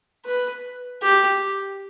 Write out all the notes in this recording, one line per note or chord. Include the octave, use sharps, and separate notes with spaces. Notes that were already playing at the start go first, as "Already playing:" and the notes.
B4
G4